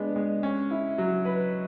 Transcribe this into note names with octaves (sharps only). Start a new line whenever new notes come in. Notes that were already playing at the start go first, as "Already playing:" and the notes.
Already playing: G#3 B3 D4
G#3
C#4
E4
F#3
B4